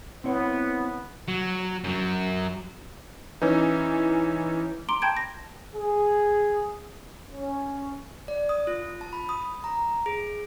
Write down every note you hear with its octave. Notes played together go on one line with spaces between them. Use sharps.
B3 C4 E4 C#5
F#3
F#2 F#3
E3 C#4 D#4 B4
A#5 C6 D6 D7 G7
G5 A5 B5 G6 G#6 D7
A#6
G#4
C#4
D5
D#6
F4
A5
B5
D#6
A#5
G#4